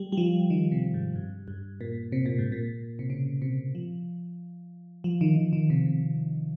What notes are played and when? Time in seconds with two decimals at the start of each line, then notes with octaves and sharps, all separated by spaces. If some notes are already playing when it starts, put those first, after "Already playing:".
Already playing: G3
0.12 G3
0.17 F3
0.50 D#3
0.72 C3
0.94 G#2
1.16 G2
1.48 G2
1.81 A#2
2.12 C3
2.26 A#2
2.39 G#2
2.52 A#2
2.99 C3
3.10 C#3
3.42 C3
3.75 F3
5.04 F3
5.21 D#3
5.37 D#3
5.53 D#3
5.70 C3
5.86 C3